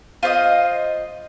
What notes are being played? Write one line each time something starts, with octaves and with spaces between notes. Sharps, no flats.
F4 C5 D5 D#5